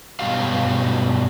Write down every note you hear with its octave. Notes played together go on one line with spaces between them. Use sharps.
G2 B2 E3 F#3 G4 F5